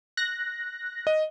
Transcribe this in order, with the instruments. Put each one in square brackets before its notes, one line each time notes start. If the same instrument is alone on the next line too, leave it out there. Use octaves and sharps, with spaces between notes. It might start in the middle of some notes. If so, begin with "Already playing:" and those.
[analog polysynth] F#6 A#6
[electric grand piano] D#5